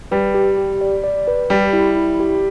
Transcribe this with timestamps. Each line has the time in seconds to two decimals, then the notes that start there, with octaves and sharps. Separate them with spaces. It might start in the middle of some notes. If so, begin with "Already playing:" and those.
0.11 G3 B4
0.34 G4
0.58 G4
0.81 D5
1.04 D5
1.27 B4
1.50 G3 G4
1.73 E4
1.97 E4
2.20 G4